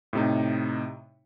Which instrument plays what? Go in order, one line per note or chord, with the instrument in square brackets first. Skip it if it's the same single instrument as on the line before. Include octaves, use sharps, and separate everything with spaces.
[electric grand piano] A2 C3 D#4